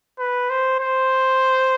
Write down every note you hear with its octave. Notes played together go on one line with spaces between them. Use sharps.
B4
C5
C5